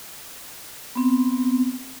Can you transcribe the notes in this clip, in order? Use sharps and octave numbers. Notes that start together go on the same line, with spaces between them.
B3 C4